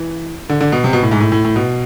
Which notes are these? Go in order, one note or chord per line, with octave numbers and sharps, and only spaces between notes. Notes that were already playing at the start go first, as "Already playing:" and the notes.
Already playing: E3
D3
D3
B2
C3
B2
A2
G#2
A2
A2
A2
B2